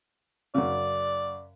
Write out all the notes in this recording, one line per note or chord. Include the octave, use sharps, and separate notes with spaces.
F#2 C#3 D5